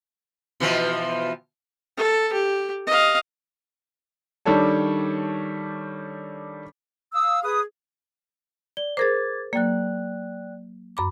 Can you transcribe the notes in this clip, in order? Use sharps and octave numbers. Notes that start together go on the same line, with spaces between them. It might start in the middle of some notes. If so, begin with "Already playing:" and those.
B2 E3 F3
A4
G4
D#5 F5
D#3 G3 D4 A4 C#5 A5
F5 D#6 E6
G#4 B4 D#6
D5 G7
G#4 A#4 C5 D6 G#6 A6
F#3 A#3 D5 G5 F#6
F#2 B5 D6